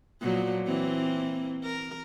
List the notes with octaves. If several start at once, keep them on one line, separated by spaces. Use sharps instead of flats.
A#2 F3 F#3
E3 A#3 C4
A#4